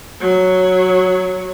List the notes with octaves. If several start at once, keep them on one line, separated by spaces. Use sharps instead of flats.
F#3 C#5